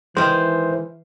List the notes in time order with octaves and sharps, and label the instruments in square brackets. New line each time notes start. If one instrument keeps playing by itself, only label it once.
[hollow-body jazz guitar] D#3 G#3 [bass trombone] E3 [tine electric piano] C5